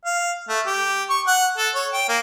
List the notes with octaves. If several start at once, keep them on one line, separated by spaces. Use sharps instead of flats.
F5
A3
G4
C#6
F#5
A4
C#5
G5
A#3